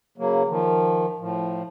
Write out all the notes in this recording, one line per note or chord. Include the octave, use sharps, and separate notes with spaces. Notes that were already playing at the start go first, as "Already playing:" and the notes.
C#3 F#3 A#3
D#3 F3
A2 F3